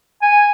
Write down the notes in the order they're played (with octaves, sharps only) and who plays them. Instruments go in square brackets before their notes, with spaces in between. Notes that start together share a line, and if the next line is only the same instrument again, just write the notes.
[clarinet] G#5